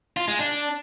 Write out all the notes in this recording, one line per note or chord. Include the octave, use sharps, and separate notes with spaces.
F4
G#3
D4